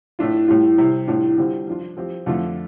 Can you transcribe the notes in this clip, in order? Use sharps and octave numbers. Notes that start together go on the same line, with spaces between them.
A2 A3 D4 F4
A2 G3 F4
C3 G3 C4
A2 G3 D4 F4
D3 G3 C4 F4
F3 D4 F4
F3 C4 G4
F2 D3 A3 F4